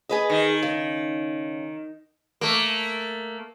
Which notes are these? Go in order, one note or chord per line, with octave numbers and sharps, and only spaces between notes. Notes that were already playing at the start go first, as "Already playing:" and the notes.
G#4 B4 D#5
D#3
C#3
A3 A#3